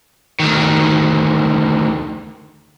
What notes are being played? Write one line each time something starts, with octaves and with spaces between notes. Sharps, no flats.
D2 D#3